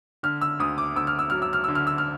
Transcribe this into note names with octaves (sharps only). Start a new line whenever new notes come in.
D3 F6
E6
D2 D#6
D6
D2 E6
F6
E6
F#3 F6
E6
F6
D3 E6
F6
E6
F6